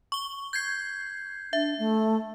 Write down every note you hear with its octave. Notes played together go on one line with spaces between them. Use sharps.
C#6 G7
G6 G#6 C7
D4 E5
A3